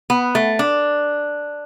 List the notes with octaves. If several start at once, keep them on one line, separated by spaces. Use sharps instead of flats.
B3
A3
D4